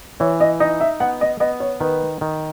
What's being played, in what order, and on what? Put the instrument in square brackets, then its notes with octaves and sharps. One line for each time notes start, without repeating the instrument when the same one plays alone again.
[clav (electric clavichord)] E3 [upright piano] C#5
[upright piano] D#5
[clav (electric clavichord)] D#4 [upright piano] D#5
[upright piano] E5
[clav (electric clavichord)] B3 [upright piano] F#5
[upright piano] D#5
[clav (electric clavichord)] B3 [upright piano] D#5
[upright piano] C#5
[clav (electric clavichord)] D#3 [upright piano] B4
[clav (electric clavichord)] D#3